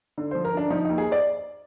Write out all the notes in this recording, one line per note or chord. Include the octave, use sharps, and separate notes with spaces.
D3
F3 C5
A#4
D3 D4
F3 D#4
D#2 D#4
G#4
D5